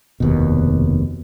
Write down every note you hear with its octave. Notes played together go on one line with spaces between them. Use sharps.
F1 D#2 B2